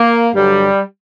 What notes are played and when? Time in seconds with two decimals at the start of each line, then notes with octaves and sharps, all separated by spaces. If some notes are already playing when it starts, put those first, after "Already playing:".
Already playing: A#3
0.34 G2 D3 F#3 G3